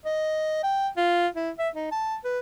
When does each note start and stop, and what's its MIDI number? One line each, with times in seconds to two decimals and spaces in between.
0.05 0.60 75
0.63 0.89 79
0.97 1.27 65
1.36 1.51 64
1.59 1.69 76
1.75 1.87 63
1.92 2.16 81
2.24 2.39 71